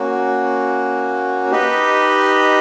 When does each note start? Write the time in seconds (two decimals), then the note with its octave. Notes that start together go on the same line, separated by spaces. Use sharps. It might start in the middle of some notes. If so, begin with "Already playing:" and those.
Already playing: A#3 C#4 F#4
1.50 D#4 G4 B4 D#5